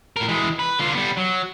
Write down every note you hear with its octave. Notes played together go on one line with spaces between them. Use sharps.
A2 A#4
E3 G#3
B4
D3 F4
G3 B3
F#3